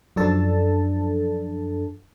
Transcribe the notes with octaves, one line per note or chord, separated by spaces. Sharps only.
F#2 F3 D4 A4 A5